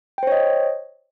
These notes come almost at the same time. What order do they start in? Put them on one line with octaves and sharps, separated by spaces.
G5 C5 C#5 D#5